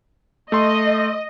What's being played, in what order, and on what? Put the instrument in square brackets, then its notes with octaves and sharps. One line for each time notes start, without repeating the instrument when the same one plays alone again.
[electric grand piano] A3 C6 [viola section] D#5